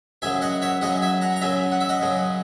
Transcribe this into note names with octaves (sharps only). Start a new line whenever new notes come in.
F#2 C#3 F#3 E5 G#5
D#5 F#5
C#5 E5
F#2 C#3 F#3 D#5 F#5
E5 G#5
F#5 A#5
A#5
F#2 C#3 F#3 E5 G#5
F#5
E5
D#5 F#5
F#2 C#3 F#3